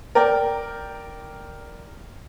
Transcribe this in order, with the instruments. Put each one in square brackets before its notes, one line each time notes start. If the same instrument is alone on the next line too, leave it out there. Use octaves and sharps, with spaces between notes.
[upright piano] A#4 D5 G5